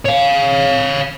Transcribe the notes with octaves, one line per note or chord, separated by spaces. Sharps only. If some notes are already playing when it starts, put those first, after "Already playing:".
C#5 F5